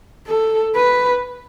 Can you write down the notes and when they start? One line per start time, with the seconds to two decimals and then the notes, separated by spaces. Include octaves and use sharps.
0.27 A4
0.76 B4